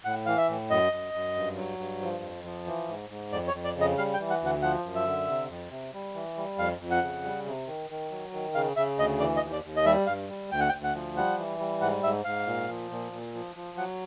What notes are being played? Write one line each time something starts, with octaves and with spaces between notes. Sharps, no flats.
A2 F#5
E3 F5
E5
A2
F#2 D#5
F#2
F#2
G2
F#3
G2
F3
F2
F3
E3
G#2
G#2
F2 D5
C#5
F2
D5
C#3
D#5
G3 F5
G5
E3
F#5
D2 F#5
F3 F#5
F#2
E5
D3
C3
F2
C3
G3
E3
G3
F2 F5
F2
F#5
C#3
G3
C3
D#3
D#3
F#3
D#3
C#3 F5
C#3 E5
D2 D#5
E3 D5
D#5
D#2
D5
D#2
D#5
G3 E5
G2 F5
G3
D2 G5
F#5
G5
D2
F#5
F3
G3 F#5
E3
G3
G#2 F#5
G#2 E5
G#2 F5
A#2
F3
A#2
A#2
F3
F3
F#3 F#5